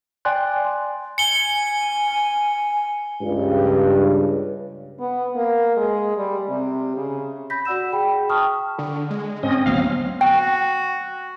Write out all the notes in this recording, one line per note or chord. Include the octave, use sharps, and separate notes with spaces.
D5 G5 G#5 C6 F#6
G#5 C#7 G7
C#2 G2
B3
A#3
G#3
G3
C3
C#3
B5 G6 A#6 B6
F#4 D5 F#5 E6 E7
G#4 G5 B5
G5 A5 C#6 D#6 F6
D3
G#3
G#2 C4 C#4 D#5
D2 F#3 B3 F5
F#4 G5